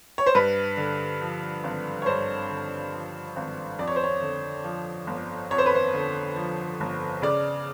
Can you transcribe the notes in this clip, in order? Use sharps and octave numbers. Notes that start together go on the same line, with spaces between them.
C#5
C5
G2 B4
D3
F3
G#1
C#5
G2 C5
D3
F3
G#1
F2 D5
C#5
C5
C#5
D3
F3
G1
F2 C#5
C5
B4
C5
D3
F3
G1
C#3 D5